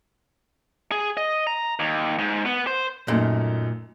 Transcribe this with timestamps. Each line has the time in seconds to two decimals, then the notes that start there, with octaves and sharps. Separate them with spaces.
0.92 G#4
1.17 D#5
1.47 A#5
1.79 D#2
2.18 G#2
2.46 B3
2.67 C5
3.08 F#2 A#2 A3 D#4